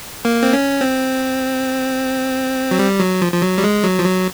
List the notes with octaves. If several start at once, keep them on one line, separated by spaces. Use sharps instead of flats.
A#3
C4
C#4
C4
F#3
G3
F#3
F3
F3
F#3
G3
G#3
F#3
F3
F#3